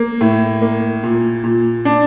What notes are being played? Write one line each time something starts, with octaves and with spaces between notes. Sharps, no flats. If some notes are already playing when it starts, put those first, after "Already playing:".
Already playing: A#3
A2
A#3
A#2
A#2
D4